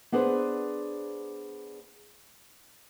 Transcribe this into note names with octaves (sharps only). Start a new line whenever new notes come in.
B3 D4 G#4 B4 C5